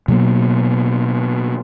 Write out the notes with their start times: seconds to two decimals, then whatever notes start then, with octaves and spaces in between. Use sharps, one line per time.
0.08 B2 F#3 A#3 B3